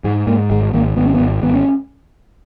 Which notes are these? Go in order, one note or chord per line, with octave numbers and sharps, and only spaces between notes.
G#2 G#3
G#2 A#3
G#1 G#3
G#1 A#3
G#1 B3
C#4
B3
G#1
G#1 B3
C#4